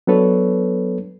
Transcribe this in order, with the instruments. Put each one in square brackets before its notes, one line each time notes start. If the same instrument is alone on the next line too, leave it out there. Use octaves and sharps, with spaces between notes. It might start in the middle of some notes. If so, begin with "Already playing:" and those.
[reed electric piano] F#3 B3 D4 A4 B4 C#5